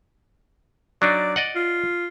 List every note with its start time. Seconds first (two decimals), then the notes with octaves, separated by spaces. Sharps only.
1.02 F#3 D4 D#4 D5
1.36 D5 D#5 F#5
1.56 F4